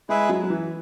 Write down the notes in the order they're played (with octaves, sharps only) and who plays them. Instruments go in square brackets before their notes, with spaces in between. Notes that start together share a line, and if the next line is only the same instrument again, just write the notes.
[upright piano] G#3 [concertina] E4 G#4 B4 E5
[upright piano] F#3
F#3
E3